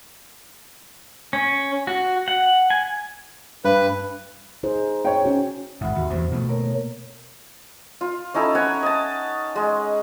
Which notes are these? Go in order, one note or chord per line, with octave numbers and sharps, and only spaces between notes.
C#4
F#4
F#5
G#5
G2 B4
D#4 G#4 C5
C#5 G5
C#4 F#4
G#1 G#2 E5 F#5 B5
D#2 F#4
E2 G2 C5
B2 A3
A#3 A#4 C#5
F4
C#4 D#4 E4 A4
C#5 F#5 G#5 B5
D#5 A5
G#3